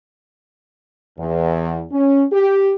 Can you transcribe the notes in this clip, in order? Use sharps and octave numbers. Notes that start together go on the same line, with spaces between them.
E2
C#4
G4